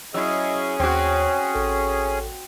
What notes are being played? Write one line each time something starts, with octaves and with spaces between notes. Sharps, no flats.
F#3 C#4 E4 G#4 D#5 E6
D#2 C4 F#4 C#5
A1 A4